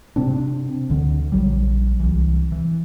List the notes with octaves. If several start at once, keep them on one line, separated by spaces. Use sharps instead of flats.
C3 C4 D4
D2 D3
A#1 F#3 G3
C2 E3
E3